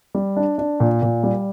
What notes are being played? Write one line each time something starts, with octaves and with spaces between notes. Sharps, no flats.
G3
D4
D4
A#2
A#2
G3